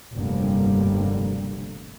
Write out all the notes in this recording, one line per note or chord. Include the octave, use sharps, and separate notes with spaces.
F1 B1 G2 D3 G3 A#3